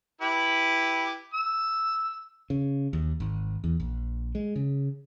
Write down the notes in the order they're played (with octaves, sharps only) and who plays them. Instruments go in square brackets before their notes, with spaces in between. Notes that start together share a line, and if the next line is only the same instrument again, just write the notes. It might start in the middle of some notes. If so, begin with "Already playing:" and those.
[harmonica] E4 G4 B4
E6
[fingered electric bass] C#3
D#2
G#1
E2
A#1
G#3
C#3